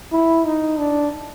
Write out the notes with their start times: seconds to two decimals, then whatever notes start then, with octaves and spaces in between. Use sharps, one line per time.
0.12 E4
0.46 D#4
0.79 D4